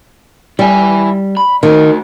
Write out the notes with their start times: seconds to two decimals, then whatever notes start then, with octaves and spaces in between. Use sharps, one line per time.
0.59 G3 E4 G#5
1.37 B5
1.63 D#3 A3 F#4